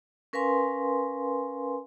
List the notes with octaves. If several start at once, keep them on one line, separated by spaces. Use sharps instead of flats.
C#4 A#4 B4 F5 G#5 C6